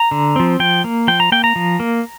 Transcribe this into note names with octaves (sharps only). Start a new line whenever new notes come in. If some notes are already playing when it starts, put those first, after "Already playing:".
Already playing: A#5
D3
F3 C4
F3 G5
A#3
F3 G5
A#5
A#3 G5
A#5
F3
A#3